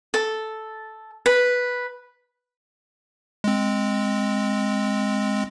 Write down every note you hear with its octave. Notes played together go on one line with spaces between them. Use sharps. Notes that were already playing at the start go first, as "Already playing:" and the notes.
A4
B4
G#3 C4